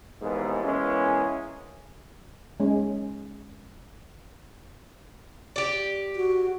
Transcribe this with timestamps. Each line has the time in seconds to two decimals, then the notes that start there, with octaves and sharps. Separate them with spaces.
0.20 D#2 G#2 E3 G#3 A#3 B3
0.63 E3 G#3 A#3 B3 C#4
2.60 G#3 C#4
5.56 G4 D5
6.16 F#4